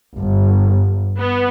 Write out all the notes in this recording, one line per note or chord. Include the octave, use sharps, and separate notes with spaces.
G1
B3